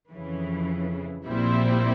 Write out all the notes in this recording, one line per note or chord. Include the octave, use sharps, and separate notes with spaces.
F2 C#3 E3
A#1 A#2 G3 C4 E4